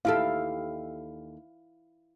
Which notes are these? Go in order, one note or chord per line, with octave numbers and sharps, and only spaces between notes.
D#2 E4 G4 A4 F5